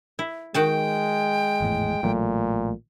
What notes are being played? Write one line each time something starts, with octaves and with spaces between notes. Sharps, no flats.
E4
D#3 G#3 F#4 G5 A5
G#1 E2 A2
A1 A#2 F#3 A3